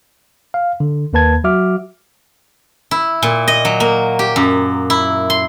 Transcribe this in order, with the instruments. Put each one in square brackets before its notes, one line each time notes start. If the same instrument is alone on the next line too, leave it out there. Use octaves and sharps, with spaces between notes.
[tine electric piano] F5
D3
D#2 A#3 B4 A5 G#6
F#3 F#4 E5 D6 F6
[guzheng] E4
A#2
D#5
F#3
A#3
G4
F#2
E4
C6